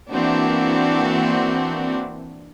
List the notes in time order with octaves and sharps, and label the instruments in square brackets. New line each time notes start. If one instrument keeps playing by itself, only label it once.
[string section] E3 A#3 C4 D4 F#4